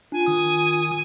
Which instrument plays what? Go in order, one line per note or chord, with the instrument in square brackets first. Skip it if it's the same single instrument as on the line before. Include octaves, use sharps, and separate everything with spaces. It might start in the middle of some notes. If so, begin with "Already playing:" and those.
[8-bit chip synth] D4 [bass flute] F4 [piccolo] G#5
[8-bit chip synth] D#3 D#6